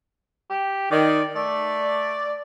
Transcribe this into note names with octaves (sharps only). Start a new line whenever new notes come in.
G4
D#3 D5
A3 D5